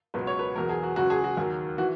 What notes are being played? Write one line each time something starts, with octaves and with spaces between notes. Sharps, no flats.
C#2 B2 F#3 B4
C#5
B4
E2 B2 F#3 A#4
G#4
F#4
C#2 C#3 F#3 F#4
G#4
F#4
D#2 D#3 F#3
E3 F#4